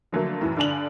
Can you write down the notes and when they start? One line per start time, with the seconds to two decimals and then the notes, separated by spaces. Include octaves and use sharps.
0.13 D3 F3 F#3 A3 A#3
0.41 F#2 A2 E3
0.57 G2 D3 D4 G#5 F7 F#7